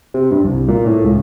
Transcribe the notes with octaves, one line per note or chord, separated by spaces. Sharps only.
C3
G2
C2
A#2
A2
C#2